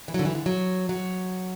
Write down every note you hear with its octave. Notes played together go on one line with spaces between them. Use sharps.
E3
D3 F#3
E3
D3
F#3
F#3